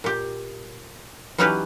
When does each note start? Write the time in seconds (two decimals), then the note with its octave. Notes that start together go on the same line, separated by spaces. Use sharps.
0.04 A#2 G4
1.38 E3 F#3 C#4 D#4 G4 B4